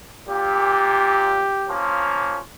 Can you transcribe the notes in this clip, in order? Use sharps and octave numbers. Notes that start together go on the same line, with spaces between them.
A#2 G4
F3 A#3 C#4